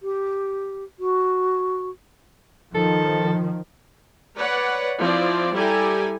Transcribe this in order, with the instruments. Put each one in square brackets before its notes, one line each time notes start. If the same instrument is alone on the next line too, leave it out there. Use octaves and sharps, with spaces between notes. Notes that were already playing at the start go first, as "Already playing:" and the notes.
[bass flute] G4
F#4
[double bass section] D#3 F3 [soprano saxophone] A4
[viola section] B4 C#5 D5 F#5
F3 C4 E4 D5
G3 E4 G4 A4 G#5 A#5